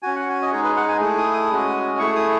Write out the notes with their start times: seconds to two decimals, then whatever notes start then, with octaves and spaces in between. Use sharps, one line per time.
0.02 C#4 F#4 G#5
0.16 F#5
0.30 G#5
0.42 D#5
0.52 G#3 D#4 G#4 C#5
0.63 B4
0.77 F#5
0.88 G#5
1.00 A3 E4 G#4
1.18 D#6
1.34 D#6
1.50 G#3 C#4 F#4
1.99 A3 E4 G#4 C#6
2.16 D#6